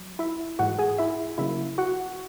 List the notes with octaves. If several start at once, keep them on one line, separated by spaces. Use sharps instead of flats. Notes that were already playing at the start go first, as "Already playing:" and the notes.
Already playing: F#3
E4 E5
G#2 E3 G#3 F#4 F#5
G#4 G#5
E4 E5
C#3 F#3 A#3 E4 E5
F#4 F#5